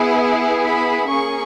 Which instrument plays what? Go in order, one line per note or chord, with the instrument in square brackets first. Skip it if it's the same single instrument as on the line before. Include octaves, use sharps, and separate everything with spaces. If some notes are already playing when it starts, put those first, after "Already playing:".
Already playing: [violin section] B3 E4 G#4
B5
A#3 C#4 G#4 C#6